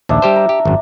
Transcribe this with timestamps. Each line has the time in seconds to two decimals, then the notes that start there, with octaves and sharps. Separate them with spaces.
0.09 A#1 D#2 D4 E5
0.22 G3 G4 C5
0.36 A#5
0.49 G4
0.65 G#1 F#2